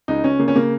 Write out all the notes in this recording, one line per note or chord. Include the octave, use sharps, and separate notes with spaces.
C#2 D#4
C#2 C#4
C#3 A#3
C#4
C#3 A#3